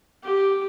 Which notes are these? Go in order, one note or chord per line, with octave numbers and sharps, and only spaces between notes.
G4